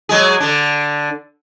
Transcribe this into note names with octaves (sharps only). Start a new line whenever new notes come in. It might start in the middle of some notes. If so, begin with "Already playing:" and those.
F#3 G#3 G#4
D3 D4